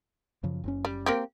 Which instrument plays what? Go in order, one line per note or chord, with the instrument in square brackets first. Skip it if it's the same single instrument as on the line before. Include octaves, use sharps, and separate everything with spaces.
[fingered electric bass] F#2 C#3 F3
F#1 F#2 C#4
[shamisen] G3
A#3 C4 G4